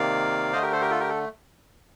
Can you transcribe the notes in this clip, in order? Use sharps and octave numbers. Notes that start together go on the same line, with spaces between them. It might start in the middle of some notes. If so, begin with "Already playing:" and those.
Already playing: C3 D#3 A#3 D5 F5
D3 A3 C5 D#5
G4 A#4
A4 C5
G4 A#4
F4 A4
G4 A#4
A4